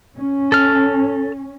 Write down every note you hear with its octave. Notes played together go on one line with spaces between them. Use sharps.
C#4
A4 F6